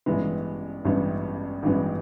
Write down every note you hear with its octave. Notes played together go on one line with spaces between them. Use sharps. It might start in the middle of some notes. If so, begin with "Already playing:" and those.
A1 G2 E3 G#3 B3
A1 G2 E3 G#3 B3
A1 G2 E3 G#3 B3